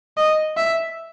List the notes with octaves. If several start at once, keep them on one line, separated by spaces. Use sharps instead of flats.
D#5
E5